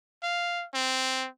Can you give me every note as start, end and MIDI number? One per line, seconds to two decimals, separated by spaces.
0.23 0.65 77
0.74 1.27 60